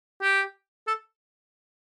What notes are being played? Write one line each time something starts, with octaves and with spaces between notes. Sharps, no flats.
G4
A4